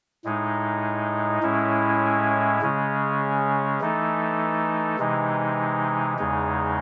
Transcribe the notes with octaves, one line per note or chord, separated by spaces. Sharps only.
A2 G#3 D#4
A2 G#3 C#4 E4
C#3 G#3 C#4
E3 A3 D#4 A4
C3 E3 G#3 D#4
E2 C#3 G#3 D#4